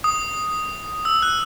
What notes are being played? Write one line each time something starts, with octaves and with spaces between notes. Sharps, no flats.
D#6
E6
F#6